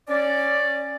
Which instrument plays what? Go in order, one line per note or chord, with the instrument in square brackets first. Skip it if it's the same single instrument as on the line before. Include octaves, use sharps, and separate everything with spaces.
[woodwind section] C#4 D5